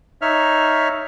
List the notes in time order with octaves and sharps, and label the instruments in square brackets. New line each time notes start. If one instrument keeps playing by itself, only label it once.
[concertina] D#4 C#5 E5 F6